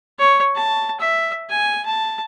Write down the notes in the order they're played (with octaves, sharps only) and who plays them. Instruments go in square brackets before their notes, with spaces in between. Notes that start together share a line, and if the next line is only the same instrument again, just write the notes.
[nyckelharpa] C#5
A5
E5
G#5
A5